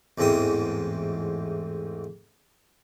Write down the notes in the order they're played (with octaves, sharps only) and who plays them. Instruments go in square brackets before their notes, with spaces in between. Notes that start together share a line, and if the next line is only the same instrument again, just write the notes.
[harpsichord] A1 E2 G#2 C4 G5 D#6